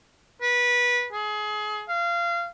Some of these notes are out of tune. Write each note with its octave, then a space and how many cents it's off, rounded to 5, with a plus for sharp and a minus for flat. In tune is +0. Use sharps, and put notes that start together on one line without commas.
B4 -20
G#4 +30
F5 -25